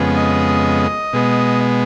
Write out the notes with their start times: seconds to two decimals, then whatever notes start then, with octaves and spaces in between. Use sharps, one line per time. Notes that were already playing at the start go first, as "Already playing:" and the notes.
Already playing: F2 C#3 G#3 B3
0.17 D#5
1.13 B2 G#3 B3